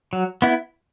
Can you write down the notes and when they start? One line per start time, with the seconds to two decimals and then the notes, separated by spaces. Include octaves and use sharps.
0.13 F#3
0.42 B3 E4